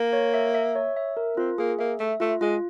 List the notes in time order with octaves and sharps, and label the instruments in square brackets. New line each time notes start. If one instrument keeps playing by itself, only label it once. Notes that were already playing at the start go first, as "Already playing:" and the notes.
Already playing: [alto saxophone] A#3
[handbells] C#5
E5
E5
C#5
E5
A#4
[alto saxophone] C4 [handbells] F4
[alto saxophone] A#3 [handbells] G#4
[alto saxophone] A#3 [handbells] E5
[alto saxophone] A3 [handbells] E5
[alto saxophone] A3 [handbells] F4
[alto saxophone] G#3 [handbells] F4